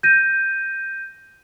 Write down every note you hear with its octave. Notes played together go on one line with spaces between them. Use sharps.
G6 A#6 D#7